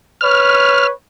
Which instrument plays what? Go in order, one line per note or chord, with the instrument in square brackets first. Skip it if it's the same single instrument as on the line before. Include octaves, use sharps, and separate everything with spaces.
[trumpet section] B4 C#5 [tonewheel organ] F6